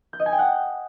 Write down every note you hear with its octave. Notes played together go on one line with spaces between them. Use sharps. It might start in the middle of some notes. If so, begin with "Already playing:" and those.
G6
D#5
G#5
G5
F#5